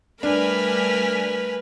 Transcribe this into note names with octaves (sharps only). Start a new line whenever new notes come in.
G3 A3 D4 A#4 B4 G#5 F6 B6